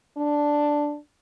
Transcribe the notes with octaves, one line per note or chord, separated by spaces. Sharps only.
D4